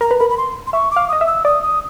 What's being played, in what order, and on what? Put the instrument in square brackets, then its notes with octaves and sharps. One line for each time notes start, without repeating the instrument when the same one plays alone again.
[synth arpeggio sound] A#4 [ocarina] A#5
[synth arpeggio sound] B4
[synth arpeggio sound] A#4 [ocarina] B5
[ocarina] B5
C6
C6
[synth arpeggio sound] E5 [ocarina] C#6
[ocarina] D6
[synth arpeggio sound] F5
[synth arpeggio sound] D#5 [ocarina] D#6
[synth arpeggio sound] E5
[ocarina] E6
[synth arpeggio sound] D5 [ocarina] D#6
[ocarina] D#6